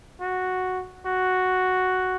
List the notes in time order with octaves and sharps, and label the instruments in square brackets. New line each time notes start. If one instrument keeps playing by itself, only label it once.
[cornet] F#4
F#4